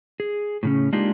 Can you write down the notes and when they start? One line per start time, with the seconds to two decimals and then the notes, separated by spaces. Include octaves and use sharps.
0.20 G#4
0.63 A2 C#3 C#4
0.93 G#3 A#3 D4 D#4 F4 G4